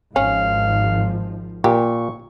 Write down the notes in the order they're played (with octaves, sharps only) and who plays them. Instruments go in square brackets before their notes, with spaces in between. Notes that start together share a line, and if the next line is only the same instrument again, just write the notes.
[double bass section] G#1 F3 [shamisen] C#4 [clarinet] F5
[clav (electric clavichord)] A#2 [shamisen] G4 [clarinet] C#6